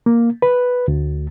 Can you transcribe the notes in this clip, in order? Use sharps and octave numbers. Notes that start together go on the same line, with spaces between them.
A#3
B4
D2